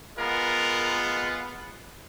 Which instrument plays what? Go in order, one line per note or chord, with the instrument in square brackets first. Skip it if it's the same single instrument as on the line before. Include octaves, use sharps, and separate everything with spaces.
[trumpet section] G#3 B3 F4 A#4